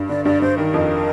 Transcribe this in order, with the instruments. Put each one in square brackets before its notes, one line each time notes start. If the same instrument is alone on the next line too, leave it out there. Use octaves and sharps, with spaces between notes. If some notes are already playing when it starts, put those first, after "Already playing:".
Already playing: [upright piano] G2
[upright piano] D3 [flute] D5
[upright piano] G2 [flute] D5
[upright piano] G2 [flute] C5
[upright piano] D#3 [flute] A#4
[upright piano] F2